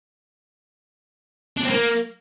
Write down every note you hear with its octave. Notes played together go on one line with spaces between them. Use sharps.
D4
C4
A#3